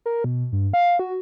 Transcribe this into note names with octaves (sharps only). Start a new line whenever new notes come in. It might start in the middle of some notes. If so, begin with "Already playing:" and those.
A#4
B2
G2
F5
F#4